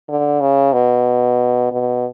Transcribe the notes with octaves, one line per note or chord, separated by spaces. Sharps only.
D3
C#3
B2
B2